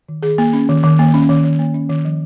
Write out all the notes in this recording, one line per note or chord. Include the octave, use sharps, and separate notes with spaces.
D#3
D#3 G#4
A#3
C#4
D#3
D#3
A#3
C#4
D#3
D#3
A#3
C#4
D#3
F3